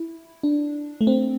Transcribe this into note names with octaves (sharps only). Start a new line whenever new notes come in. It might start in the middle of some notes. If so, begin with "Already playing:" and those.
Already playing: E4
D4
A3
C4